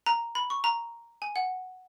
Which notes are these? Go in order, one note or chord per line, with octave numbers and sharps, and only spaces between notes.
A#5
B5
C#6
A#5
G#5
F#5